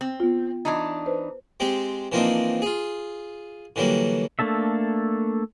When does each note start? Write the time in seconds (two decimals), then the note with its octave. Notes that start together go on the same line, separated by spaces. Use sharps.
0.01 C4
0.20 B3 F4
0.65 E3 D4 D#4
1.06 B4 C5
1.60 G#3 C4 G4
2.12 E3 F3 A#3 C4 D4 D#4
2.62 F4 G#4
3.76 D3 E3 F#3 G3 A#3
4.39 A3 A#3 D4 A4 E5